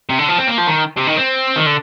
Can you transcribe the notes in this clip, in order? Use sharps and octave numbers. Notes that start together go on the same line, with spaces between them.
C3
D3
F3
C4
A#3
F3
D#3
C3
D#3
C4
D#3
D3